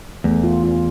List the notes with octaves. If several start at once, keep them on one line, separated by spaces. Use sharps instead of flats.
E2 A3
F4
F4